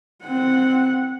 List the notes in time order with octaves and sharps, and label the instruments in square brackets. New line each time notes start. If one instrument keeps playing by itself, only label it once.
[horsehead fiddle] C4 F#5